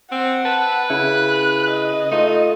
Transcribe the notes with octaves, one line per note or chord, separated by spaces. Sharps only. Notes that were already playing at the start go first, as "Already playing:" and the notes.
C4 F#5
B4 A5
C#3 E4 F#6
D#5
A3 D#4 F4